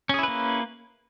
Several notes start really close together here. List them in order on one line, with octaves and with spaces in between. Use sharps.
C#4 G#4 E4 B4 A#3